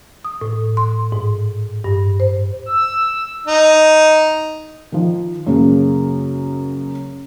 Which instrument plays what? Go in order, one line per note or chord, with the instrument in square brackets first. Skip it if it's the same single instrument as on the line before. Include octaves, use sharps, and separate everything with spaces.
[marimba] D#6
A2
C6
G#2
G2
C5
[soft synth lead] E6
[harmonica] D#4
[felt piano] D#3 F3
F#2 C#3 A#3 G#4